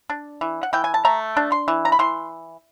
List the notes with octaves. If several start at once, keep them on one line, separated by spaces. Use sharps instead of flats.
D4
E3
F#5
E3 G5
G#5
A5
A3 A#5
D4
C6
E3
A#5
B5
E3 C6